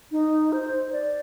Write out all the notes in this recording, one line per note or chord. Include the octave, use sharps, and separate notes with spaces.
D#4
C5
D5